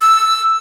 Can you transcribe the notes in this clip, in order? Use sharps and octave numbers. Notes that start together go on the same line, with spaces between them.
E6